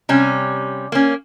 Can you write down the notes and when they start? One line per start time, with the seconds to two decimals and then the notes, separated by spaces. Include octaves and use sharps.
0.09 C3 G3 C#4
0.92 A#3 C#4